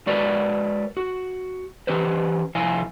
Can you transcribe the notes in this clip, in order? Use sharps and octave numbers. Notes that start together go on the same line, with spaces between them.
G#3 F#4 A#4 B4 C#5 D5
F#4
E3 C#4 G4 B4 C5
C2 F3 E4 F5 G#5